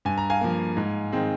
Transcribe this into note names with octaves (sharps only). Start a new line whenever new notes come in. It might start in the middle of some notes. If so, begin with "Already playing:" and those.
G2 G#5
A#5
F5 G#5
F3 A#3
G#2
D#3 G#3 C4